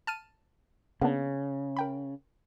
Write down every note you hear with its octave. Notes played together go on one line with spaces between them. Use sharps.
A5 F6 D#7
C#3 A#3 B3 D4
A#4 G5 B5